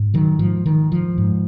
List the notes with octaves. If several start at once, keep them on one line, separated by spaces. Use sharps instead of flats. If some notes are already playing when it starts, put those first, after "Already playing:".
Already playing: G#2
D#3 F#3
G#2 F3
D#3
F3
G#2